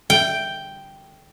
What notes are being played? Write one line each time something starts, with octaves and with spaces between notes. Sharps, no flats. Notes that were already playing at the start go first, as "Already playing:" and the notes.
G5